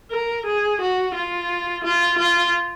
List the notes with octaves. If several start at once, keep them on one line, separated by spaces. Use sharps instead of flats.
A#4
G#4
F#4
F4
F4
F4